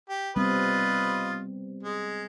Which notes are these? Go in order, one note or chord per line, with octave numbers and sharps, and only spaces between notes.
G4
G3 B3 C4 F4 B4 D#5
G#3